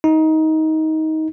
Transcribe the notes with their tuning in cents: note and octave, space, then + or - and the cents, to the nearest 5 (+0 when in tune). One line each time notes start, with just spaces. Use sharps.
D#4 +20